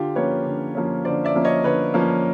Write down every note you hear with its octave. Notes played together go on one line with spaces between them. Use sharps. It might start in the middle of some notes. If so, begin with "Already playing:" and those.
Already playing: D3 F4 G4
F3 A#3 C#4 B4 C#5
D3
F3 A#3 C#4
D3 C5 D5
D5 E5
F3 A#3 C#4
C#5 D#5
D3 B4 C#5
F3 A#3 C#4